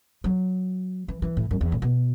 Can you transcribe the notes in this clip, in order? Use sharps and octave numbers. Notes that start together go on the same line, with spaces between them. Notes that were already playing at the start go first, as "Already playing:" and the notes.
F#3
E3
E3
A2
F#2
E2
A2
B2